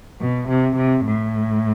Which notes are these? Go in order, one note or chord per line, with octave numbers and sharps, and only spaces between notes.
B2
C3
C3
A2